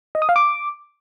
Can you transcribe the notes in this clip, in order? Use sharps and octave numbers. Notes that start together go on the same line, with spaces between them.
D#5
D#6
F5
D6